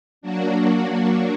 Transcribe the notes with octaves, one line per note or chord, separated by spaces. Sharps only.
F#3 A#3 D4 F#4